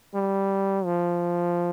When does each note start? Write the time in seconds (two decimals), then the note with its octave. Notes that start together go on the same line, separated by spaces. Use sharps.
0.15 G3
0.85 F3